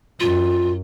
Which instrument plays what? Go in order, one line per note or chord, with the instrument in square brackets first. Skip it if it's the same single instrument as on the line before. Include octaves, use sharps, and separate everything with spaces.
[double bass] F#2 [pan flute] F4